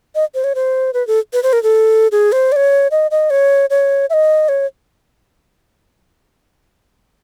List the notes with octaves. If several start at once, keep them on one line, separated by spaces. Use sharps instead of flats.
D#5
C5
C#5
C5
B4
A4
B4
C5
A#4
A4
G#4
C5
D5
C#5
D#5
D#5
C#5
C#5
E5
D#5
C#5